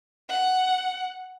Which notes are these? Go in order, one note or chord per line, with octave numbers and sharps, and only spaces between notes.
F#5